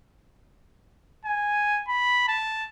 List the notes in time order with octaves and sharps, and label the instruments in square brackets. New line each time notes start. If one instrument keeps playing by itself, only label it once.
[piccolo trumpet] G#5
B5
A5